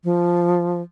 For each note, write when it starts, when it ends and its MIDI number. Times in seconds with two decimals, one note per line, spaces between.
0.04 0.81 53